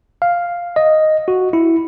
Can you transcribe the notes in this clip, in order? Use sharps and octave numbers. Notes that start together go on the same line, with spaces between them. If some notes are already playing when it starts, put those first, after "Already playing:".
F5
D#5
F#4
E4